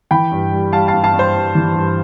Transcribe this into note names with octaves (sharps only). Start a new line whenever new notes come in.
E3 G5 B5
G2
G3
G3 F5 A5
F5 A5
G2
F5 A5
G2
C5
G2
E3
G2